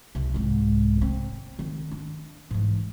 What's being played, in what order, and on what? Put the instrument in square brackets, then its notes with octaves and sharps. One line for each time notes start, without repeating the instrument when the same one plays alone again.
[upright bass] C2
C2 G#2
C4
D#3
D4
G#2 E3